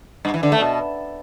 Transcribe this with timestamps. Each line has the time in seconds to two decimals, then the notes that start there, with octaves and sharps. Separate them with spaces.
0.25 G2
0.34 E3
0.43 D3
0.52 A3
0.61 B2